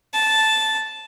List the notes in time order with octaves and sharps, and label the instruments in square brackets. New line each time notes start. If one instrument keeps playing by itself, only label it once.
[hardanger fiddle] A5